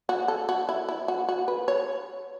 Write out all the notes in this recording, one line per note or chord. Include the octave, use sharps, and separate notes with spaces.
F#4
A4
F#4
E4
E4
F#4
F#4
B4
C#5